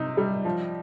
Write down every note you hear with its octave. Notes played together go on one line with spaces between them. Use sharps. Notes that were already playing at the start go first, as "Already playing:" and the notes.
Already playing: C3 D#4
G3
F3